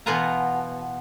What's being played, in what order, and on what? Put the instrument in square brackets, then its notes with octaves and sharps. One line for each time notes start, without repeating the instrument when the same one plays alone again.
[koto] B2 E3 B3 F4 G#5 A#5